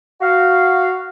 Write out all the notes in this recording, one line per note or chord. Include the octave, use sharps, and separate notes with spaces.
F#4 F5